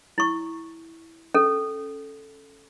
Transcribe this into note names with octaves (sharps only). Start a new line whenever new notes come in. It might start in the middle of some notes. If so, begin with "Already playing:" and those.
E4 C#6
C#4 A4